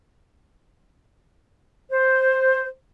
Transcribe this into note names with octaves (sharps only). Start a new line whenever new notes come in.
C5